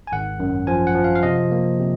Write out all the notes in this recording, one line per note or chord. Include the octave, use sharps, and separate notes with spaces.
G#5
G#1 F#5
F#2
F3 G#5
F#5
F3
F5
F5
C3 D#5
A#3
C3